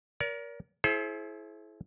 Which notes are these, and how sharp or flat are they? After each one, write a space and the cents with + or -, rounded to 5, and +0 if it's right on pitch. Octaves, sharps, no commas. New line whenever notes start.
A#4 +25 D5 -45
E4 +0 G#4 +45 C5 +25